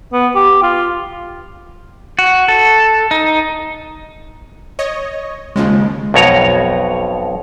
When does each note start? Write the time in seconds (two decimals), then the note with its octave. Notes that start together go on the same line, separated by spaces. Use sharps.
0.13 B3
0.35 G4
0.63 F4
2.19 F#4
2.48 A4
3.11 D#4
4.79 C#5 D#5
5.56 D#2 C#3 F3 G#3
6.14 B1 F2 B2 C#5 A#5